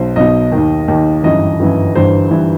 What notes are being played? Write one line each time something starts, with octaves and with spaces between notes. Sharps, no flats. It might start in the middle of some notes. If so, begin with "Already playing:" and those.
Already playing: B1 B2 C5
B1 B2 D#5
D#2 D#3
D#2 D#3
G1 F#2 E3 D#5
G1 F#2 E3
G1 G2 E3 C5
G2 E3